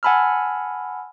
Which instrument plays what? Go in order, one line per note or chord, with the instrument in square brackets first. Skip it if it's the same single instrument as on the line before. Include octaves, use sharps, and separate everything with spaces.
[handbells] F#5 G#5 A5 B5 E6 F6